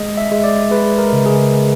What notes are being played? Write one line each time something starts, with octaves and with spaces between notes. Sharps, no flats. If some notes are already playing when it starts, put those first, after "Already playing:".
Already playing: G#3 D#5
E5
G#3
D5
G#3 B4
A#4
C#3
G#4